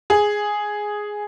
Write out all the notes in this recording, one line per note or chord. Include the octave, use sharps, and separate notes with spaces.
G#4